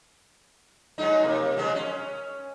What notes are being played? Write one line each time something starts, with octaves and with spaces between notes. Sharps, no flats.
F#3 G#3 D#4
C3 A#3
C#3 F#3 G#3
C#4